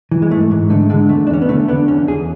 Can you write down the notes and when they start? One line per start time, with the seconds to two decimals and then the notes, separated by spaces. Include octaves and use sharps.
0.11 E3
0.22 G#3
0.31 G#2 A3
0.51 G#2
0.70 D3 A3
0.90 D3 G#3
1.09 E2 A3
1.27 D4
1.30 E2 C#4
1.42 B3
1.49 D3 A3
1.68 D3 B3
1.88 E2 C#4
2.08 E2 G#4